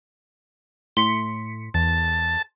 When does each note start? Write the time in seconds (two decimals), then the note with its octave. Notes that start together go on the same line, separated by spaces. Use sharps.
0.97 A2 C6 B6 C#7
1.74 E2 A5